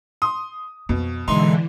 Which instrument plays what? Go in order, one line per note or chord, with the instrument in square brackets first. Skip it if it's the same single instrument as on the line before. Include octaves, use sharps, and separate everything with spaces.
[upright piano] C6 D#6
[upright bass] F2 [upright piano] B2
[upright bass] B2 [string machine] D3 E3 [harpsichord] G#3 D#4 [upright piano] C6